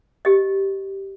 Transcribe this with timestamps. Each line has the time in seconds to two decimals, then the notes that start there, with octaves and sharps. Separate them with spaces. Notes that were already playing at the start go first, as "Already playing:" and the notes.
0.25 G4 D#5